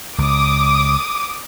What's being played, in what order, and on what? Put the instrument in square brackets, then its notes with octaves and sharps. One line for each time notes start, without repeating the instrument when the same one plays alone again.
[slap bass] C#2 [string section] D6 D#6